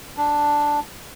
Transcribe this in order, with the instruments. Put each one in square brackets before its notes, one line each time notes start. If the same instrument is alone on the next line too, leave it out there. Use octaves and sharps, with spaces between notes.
[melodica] D4